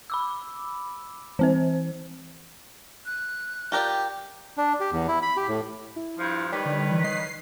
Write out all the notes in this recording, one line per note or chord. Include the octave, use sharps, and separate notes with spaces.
B5 D6 E6
E3 C4 C5
F#6
F4 G4 A#4 D5 G5
D4
G4
E2
E4
B5
G4
A2
E4
G2 F3
D#3 G3 B4 C#5
D3
E3
D#5 C7